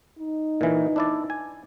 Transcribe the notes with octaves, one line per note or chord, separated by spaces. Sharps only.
D#4
A#2 E3
D4 E4 D5
G#5